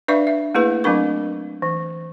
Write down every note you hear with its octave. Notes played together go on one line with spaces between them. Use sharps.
D4 B4 D5 E5 F5 C#6
E5
A3 A#3 E4 G#4 B4
F#3 A3 C4 D4 A#4 C#6
E3